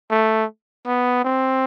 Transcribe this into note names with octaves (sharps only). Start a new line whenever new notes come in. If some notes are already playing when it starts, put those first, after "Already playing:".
A3
B3
C4